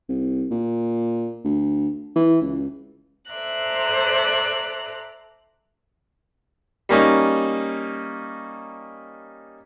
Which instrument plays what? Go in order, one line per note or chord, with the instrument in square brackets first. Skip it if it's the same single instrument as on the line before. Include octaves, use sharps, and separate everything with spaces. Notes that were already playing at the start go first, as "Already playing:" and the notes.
[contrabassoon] C2
A#2
D2
E3
C#2
[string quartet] A4 C5 D5 E5 A#5 F#6
[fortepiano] G3 A#3 C#4 D#4